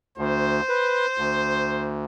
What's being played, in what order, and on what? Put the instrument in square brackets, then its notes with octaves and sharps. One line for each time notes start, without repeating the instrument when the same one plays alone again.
[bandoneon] D2 [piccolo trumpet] C5
[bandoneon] B4
D2